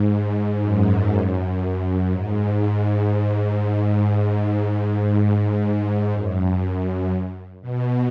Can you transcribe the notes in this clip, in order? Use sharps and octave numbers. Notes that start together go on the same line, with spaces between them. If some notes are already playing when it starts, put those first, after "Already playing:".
Already playing: G#2
F#2
G#2
G#2
G#2
F#2
B2